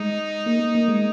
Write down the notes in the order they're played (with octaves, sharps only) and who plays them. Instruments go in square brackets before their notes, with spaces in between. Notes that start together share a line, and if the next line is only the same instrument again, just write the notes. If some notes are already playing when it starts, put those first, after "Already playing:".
Already playing: [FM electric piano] G#3 [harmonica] D#4
[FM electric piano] A#3
A#3
A#3
G#3